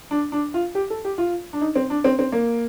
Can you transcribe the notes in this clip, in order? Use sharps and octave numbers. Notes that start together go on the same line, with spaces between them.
D4
D4
F4
G4
A4
G4
F4
D4
D#4
C4
D4
C4
C4
A#3